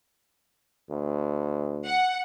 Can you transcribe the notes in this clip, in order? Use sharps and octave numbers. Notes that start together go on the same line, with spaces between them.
D2
F#5